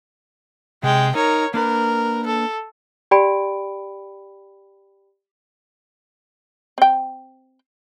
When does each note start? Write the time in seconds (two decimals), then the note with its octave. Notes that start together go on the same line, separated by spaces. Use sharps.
0.83 C3 G#3 G5
1.15 D#4 A#4 C#5
1.54 A#3 D4 A#4 B4
2.26 A4
3.11 G4 D5 G5 B5 D7
6.78 C4 G5